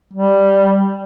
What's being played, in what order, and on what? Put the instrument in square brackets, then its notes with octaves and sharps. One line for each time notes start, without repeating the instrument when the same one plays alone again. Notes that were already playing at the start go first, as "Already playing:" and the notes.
[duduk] G3